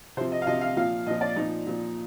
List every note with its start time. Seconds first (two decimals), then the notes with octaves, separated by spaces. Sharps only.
0.17 C3 C5
0.21 F3
0.32 D#5
0.42 F5
0.47 C3 F3 D#5
0.61 F5
0.77 A#2 F3 F5
1.07 A#2 F3 D#5
1.21 D5
1.36 A#2 F3 D#4
1.66 A#2 F3